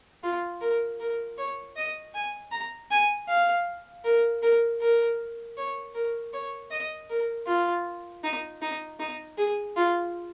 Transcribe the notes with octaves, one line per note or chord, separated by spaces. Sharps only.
F4
A#4
A#4
C#5
D#5
G#5
A#5
G#5
F5
A#4
A#4
A#4
C#5
A#4
C#5
D#5
A#4
F4
D#4
D#4
D#4
G#4
F4